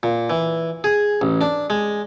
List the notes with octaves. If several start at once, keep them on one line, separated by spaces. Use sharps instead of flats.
A#2
E3
G#4
A1
D4
G#3